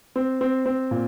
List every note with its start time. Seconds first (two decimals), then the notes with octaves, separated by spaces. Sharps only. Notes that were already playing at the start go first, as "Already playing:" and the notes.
0.16 C4
0.41 C4
0.66 C4
0.91 A#2